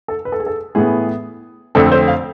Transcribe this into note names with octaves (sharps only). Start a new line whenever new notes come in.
A4
B4
A4
G#4
A4
A2 E3 B3 G#4
F2 D3 A3 C4 A4
C5
F5